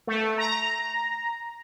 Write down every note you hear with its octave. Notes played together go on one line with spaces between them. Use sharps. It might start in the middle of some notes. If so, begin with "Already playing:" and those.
A3
A#5